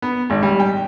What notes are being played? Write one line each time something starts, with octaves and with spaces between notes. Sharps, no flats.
B3
G#1
G3
G5